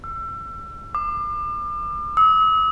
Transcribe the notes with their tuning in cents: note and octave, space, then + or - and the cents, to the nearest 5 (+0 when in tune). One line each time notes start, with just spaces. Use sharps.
E6 +30
D6 +35
E6 -45